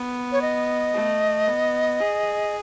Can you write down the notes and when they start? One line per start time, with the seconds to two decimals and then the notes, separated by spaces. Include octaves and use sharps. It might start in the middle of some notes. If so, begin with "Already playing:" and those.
Already playing: B3
0.32 C#5
0.42 D#5
0.95 A3
1.47 B3
2.00 G#4